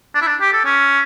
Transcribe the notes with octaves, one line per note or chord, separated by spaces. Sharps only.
D4
E4
D4
G4
A4
C#4